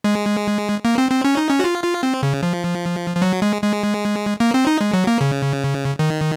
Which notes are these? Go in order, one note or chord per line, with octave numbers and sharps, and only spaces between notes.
G#3
A#3
C4
C4
C#4
D#4
C#4
F#4
F4
F4
C4
C#3
F3
F3
F#3
G#3
G#3
A#3
C4
D#4
G#3
F#3
A#3
C#3
D#3